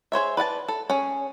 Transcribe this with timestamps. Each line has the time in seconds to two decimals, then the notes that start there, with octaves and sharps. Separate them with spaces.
0.12 G#4 C5 C#5 E5
0.37 B4 D5 F#5 A5
0.68 A4
0.90 C#4 G#4